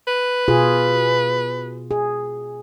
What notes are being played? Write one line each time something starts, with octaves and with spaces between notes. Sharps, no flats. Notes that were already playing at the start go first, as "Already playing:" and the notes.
B4
B2 F4 G#4
G#4